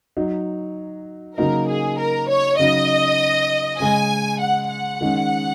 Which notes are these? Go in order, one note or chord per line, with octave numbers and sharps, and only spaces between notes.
F#3 D#4
C#3 F#3 A#3 D#4 A#4
G#4
A#4
C#5
C#3 F#3 D#4 D#5
C#3 G#3 C#4 G#5
F#5
F#5
D#3 G#3 C#4